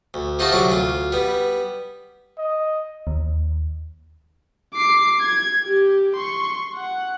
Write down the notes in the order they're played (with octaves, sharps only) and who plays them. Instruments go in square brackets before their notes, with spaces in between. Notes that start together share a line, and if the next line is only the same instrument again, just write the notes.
[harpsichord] D2
C3 D#4 F4 F#4 A5
C2 D3 F#3 D6
D2 F4
G3 B3
[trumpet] D#5
[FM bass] D#2
[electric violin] D6 C7
G#6
G4
C6 C#6
F#5